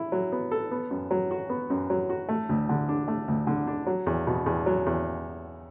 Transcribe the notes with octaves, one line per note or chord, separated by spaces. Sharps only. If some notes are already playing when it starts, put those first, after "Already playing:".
Already playing: E4
F#3
B3
A4
B3
F#2
F#3
F#4
B3
F#2
F#3
F#4
A3
D2
D3
D4
A3
D2
D3
D4
F#3
E2
B2
E2
F#3
E2